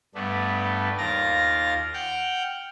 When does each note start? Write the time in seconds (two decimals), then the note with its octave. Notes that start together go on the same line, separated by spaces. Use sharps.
0.15 G2 A3 B3 D4
0.98 D#2 F4 A#4 A#5 A6 A#6
1.93 F#5 G5 F6 G6